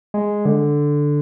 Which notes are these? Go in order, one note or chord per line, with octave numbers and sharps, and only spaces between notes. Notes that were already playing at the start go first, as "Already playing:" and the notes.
G#3
D3